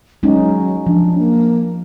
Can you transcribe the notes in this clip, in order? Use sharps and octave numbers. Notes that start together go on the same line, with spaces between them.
F#3 G#3 C#4 D#4
F3 D4
A#3